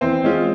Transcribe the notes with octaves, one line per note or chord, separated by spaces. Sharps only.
E3 C4 C5
G#3 C#4 F4